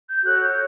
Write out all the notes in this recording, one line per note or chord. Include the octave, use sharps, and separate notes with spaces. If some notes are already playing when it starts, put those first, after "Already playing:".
G6
F#4 A4 C#5 F#6
G6